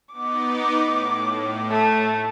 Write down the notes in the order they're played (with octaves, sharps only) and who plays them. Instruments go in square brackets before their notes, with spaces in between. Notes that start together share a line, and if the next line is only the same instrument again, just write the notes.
[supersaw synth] B3 D#4 [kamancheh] D6
[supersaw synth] A2
[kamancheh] A3